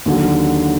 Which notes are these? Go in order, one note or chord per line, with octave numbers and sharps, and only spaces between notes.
D#2 D3 F#3